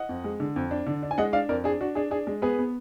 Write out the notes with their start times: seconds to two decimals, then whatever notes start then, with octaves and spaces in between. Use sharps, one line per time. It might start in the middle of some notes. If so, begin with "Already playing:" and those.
Already playing: D#5 F#5
0.09 F2
0.24 G#3
0.40 D3
0.56 F2
0.71 D4
0.86 D3
1.02 D4
1.11 G#5
1.18 G#3 D#5 F#5
1.33 D4 D5 F5
1.49 F2 A#4 D5
1.64 D4 G#4
1.81 D4 F#4
1.95 D4 G#4
2.11 D4 G#4
2.27 G#3
2.42 B3 G#4 B4
2.58 B3